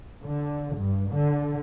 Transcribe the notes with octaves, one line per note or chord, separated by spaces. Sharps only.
D3
G2
D3